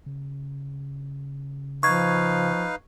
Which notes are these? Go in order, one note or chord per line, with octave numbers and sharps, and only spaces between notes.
C#3
F3 D#4 B4 F5 C#6 G#6